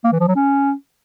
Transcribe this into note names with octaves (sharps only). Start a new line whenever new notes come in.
A#3
E3
F3
F#3
C#4